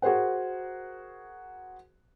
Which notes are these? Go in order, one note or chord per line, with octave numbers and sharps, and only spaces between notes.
F#4 G#4 A#4 C5 F#5